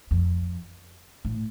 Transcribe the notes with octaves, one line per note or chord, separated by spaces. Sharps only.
F2
A2